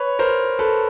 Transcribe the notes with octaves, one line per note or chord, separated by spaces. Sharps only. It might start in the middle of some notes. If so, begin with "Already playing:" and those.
Already playing: B4 C#5
A#4 C5
A4 B4